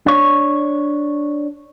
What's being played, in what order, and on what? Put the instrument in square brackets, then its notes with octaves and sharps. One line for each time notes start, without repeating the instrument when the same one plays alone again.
[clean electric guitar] D4 C#5